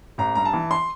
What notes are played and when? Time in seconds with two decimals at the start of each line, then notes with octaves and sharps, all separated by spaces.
0.18 A1 A#5
0.35 G2 A#5
0.45 A5
0.53 E3
0.71 C6